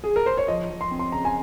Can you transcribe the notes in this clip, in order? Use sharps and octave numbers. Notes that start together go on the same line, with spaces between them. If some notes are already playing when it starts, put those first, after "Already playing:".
G#4
A#4
C5
C#5
F3 D#5
F3
C6
C4
C6
C#3 A#5
G#5